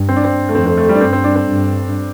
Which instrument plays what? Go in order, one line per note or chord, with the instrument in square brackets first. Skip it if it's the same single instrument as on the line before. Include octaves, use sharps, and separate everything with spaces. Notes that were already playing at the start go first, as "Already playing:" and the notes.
Already playing: [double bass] G2
[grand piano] C4
D4
C4
A3
[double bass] F2 [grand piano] C4
[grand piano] C4
A3
G3
D4
[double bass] G2 [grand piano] C4
[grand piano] C4
D4
C4
[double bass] G2